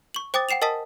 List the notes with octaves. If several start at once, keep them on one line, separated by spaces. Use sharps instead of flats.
C#6 F#7
C5 G5 D6 D#6 A6
F#5 G5 C7 E7 F7
A#4 D#5 G#5 A5 D#6 B6